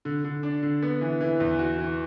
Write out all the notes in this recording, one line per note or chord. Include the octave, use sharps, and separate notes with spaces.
D3
D3
D4
D3
B3
E3
E3
E2
F#4
E3